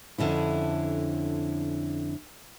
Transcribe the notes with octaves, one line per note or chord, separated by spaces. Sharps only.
F2 D3 C#4 E4